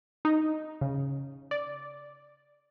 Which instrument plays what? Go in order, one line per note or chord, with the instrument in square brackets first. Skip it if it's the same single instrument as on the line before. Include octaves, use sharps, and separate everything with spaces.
[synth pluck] D#4
C#3
D5